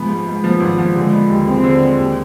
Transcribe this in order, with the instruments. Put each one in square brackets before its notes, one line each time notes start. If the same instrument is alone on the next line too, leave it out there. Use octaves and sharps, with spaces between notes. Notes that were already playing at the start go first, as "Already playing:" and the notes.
Already playing: [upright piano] F3 B3 [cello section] G#3
[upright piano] G#2
G#2
[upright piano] F3 [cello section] B3
[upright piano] G#1
F3
[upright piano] D3 [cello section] G#3
[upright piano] B3
D#2
[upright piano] G#3 [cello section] C4
[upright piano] D3
G#3
D#2